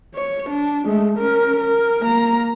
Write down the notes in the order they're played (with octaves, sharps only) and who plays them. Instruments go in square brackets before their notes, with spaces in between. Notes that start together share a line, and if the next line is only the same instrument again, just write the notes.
[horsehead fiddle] C#5
D4
G#3 A3
C#4 A#4
A#4
A#3 A#5